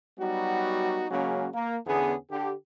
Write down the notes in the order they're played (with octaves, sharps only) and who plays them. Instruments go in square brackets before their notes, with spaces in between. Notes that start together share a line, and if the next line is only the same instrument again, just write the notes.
[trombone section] F#3 G3 B3 D#4 F#4
C#3 F#3 G#3 A#3 C#4 F#4
A#3
E2 D3 B3 C#4 G#4
D3 G4